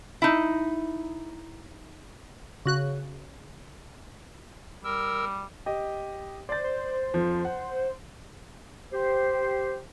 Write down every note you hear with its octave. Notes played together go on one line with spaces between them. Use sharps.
D#4 E4
C#3 F#4 F#6
G3 A#4 E6
G4 D#5
C5 D5 A6
C5
F2 F3
F#5
G4 C5